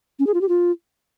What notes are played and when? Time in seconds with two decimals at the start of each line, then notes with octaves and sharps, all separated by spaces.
0.19 C#4
0.26 G#4
0.34 F4
0.41 G4
0.48 F4